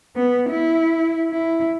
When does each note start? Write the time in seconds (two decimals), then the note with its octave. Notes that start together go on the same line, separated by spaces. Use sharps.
0.16 B3
0.49 E4
1.31 E4